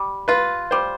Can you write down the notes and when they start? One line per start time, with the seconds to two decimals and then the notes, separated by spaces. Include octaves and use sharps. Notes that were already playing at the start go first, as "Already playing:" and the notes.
Already playing: G3
0.28 F4 B4
0.71 G3 C5